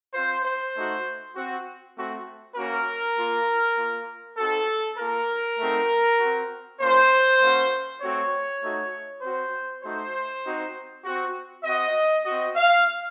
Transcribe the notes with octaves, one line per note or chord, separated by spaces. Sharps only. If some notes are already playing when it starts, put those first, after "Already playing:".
C4 F4 C5
C5
A3 D#4 F#4
C4 F#4
A3 C4 F#4
A#3 C#4 F#4 A#4
A#3 F4
A#3 F4
C4 D#4 F#4 A4
A#3 F4 A#4
A3 C4 D#4 F#4
C4 F#4
A#3 C#4 F4 C5
A#3 C#4 F#4
A3 C4 F#4 C#5
A3 D#4 F#4
C4 F#4 C5
A3 D#4 F#4 C5
C4 D#4 F#4
C4 F#4
C4 F#4 D#5
C4 F#4 D#5
F5